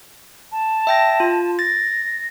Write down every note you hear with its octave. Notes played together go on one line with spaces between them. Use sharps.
A5
E5 G5 A#6
F4
A6 A#6